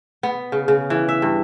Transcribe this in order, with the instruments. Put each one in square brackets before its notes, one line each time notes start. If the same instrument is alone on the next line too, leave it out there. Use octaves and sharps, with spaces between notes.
[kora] B3
C#3
C#3
E3
E5
G2